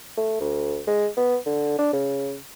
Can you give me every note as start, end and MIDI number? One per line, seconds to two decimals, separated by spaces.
0.17 0.39 57
0.40 0.80 38
0.87 1.08 56
1.17 1.37 59
1.46 1.73 50
1.79 1.92 62
1.93 2.36 49